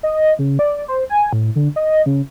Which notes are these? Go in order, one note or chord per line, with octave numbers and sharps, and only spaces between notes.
D#5
C#3
D5
C5
G#5
A2
D3
D#5
C#3